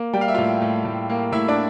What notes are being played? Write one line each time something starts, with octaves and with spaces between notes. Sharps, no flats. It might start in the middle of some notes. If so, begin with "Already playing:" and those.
Already playing: A#3
G3 G5
F5
E5
A2 F4 F5
A2
A2
A#3
A2 E4 E5
D4 D5